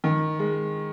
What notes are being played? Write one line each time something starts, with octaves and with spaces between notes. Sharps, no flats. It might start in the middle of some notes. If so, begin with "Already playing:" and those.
D#3
G#3